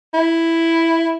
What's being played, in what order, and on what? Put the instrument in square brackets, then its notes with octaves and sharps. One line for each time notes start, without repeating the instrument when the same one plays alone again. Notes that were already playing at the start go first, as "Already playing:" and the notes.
[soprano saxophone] E4